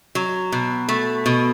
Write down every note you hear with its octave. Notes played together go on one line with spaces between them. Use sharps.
F#3
B2
A3
B2